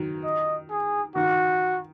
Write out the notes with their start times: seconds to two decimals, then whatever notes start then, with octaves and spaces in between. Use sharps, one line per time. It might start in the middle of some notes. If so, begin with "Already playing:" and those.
Already playing: D#3 F#3
0.24 D#5
0.70 G#4
1.15 D#3 F#4